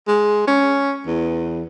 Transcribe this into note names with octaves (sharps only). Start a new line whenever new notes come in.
G#3
C#4
E2